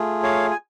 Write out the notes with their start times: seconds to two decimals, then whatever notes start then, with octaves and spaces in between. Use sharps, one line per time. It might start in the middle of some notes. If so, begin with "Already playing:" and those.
Already playing: A3 F4 G#4
0.23 C#5 F5
0.51 G#5